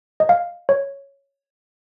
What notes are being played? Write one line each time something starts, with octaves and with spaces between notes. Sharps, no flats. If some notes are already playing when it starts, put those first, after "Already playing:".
D#5
F5
C#5